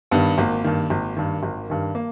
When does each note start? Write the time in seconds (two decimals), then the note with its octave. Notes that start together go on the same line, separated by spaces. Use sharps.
0.11 G2 D#3 B3
0.38 G#1 A#3
0.64 G2 D#3
0.90 G#1
1.17 G2 D#3
1.43 G#1
1.70 G2 D#3
1.95 A#3